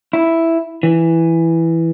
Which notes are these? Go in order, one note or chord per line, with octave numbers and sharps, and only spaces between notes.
E4
E3